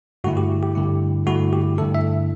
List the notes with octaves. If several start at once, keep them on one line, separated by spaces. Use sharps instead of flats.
G2 D3 A3 E4 F#4
G4
G4
G2 D3 A3 E4
G2 D3 A3 E4 F#4
G4
G2 D3 A3 E4 A4
E5